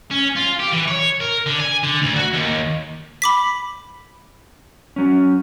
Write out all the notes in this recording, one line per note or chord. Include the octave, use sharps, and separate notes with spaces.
C#4
F4
G4
E3
C#5
A#4
D3
G#5
D3
D2
F#4
D#2
B5 D6 B6
F#3 C#4